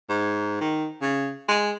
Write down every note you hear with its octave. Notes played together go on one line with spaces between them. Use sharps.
G#2
D#3
C#3
G#3